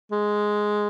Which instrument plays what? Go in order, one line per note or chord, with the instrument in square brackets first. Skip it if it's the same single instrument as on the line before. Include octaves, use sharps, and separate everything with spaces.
[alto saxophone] G#3